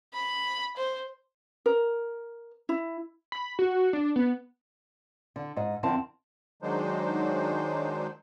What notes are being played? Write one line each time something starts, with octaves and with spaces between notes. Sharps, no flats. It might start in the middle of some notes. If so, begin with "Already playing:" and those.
B5
C5
A#4
E4
B5
F#4
D4
B3
D3
G#2 D#5
F2 D3 C4 E4 A#4 A5
D#3 F#3 G#3 D4 D#4 C5